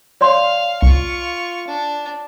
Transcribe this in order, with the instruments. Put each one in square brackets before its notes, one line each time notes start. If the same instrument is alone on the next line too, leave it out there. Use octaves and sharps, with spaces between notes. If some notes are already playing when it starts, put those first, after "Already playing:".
[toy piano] C#5 D5 C6 [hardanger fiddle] F5
[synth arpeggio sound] C2 [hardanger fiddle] F4 C#6
[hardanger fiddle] D4